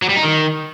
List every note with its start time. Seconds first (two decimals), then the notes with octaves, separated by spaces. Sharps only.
0.02 F#3
0.09 G3
0.16 D#4
0.23 D#3